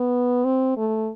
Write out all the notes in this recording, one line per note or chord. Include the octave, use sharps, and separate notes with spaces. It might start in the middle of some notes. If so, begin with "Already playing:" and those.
Already playing: B3
C4
A3